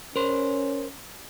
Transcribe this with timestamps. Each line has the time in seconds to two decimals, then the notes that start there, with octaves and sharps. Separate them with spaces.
0.16 C#4 A#4 C5